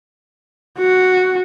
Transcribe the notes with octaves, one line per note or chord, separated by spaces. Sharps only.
F#4